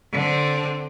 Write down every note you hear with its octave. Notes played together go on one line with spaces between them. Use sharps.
D3 C4